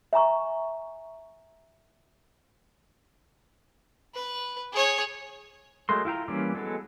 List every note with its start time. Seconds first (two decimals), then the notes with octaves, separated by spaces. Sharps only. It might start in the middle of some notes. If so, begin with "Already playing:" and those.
0.13 E5 G#5 A#5 C#6
4.15 B4
4.73 G#4 C#5
5.89 F#3 G#3 A3 A#4 C6
6.05 E4 F4 G5 A#5
6.28 E3 G3 A#3 C#4 D5
6.55 F#3 G#3 B3 A4